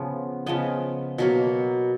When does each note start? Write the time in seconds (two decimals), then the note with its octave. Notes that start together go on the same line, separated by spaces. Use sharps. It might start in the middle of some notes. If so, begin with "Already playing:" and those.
Already playing: C#3 F3 B3
0.46 C#3 F3 B3 D#5
1.18 B2 F#3 A#3